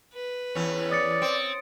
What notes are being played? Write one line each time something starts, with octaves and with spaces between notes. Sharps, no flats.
B4
E2 C#4
D5 D#6 A6 C#7
C4 D7